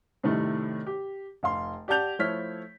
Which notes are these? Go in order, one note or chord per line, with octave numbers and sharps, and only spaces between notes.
A2 C3 D#3 G3 A3
G4
F1 F5 C6
G4 D5 F#5 A5 G6 F7
F3 A3 E4 C#5 F6 B6